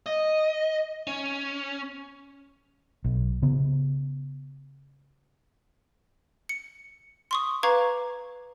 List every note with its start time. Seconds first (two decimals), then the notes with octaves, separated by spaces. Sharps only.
0.06 D#5
1.07 C#4
3.04 B1
3.42 C#3 B3
6.49 C#7
7.31 C6 C#6 D#6
7.63 B4 F5 A#5 C#6 D6 G#6